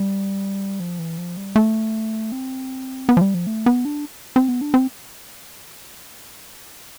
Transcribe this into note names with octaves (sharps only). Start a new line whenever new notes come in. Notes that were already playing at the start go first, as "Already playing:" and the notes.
Already playing: G3
F3
E3
F3
G3
A3
C4
B3
F3
G3
F3
A3
B3
D4
C4
B3
D4
C4